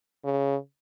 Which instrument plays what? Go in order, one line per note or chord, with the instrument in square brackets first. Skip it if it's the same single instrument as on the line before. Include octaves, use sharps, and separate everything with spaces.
[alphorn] C#3